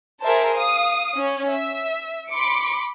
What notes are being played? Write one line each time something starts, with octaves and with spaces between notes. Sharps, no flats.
G#4 A#4 C5 E5 A5
F5 D#6
C#4
E5
B5 C6 D6 C#7 D7